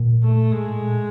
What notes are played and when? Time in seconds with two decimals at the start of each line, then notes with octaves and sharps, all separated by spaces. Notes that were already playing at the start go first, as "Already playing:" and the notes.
Already playing: A#2
0.23 A3
0.51 A2 G#3
0.81 A#2